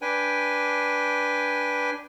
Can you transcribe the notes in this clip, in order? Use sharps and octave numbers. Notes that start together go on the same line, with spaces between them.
D4 B4 G5 G#5